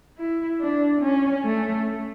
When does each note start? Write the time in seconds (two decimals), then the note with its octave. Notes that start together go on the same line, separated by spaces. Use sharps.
0.18 E4
0.61 D4
1.02 C#4
1.44 A3